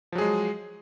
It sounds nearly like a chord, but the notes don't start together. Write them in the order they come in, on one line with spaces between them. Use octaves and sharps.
F3 F#3 G#4 G#3